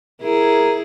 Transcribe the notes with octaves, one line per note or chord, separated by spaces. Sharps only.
E4 G#4 A#4